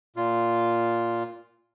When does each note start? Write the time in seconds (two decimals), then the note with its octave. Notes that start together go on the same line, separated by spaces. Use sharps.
0.16 A#2 F4